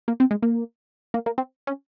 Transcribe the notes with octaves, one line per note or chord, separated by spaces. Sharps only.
A#3
C4
G#3
A#3
A#3
A#3
C4
C#4